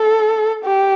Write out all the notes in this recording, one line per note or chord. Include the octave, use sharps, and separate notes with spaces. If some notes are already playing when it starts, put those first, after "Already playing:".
Already playing: A4
G4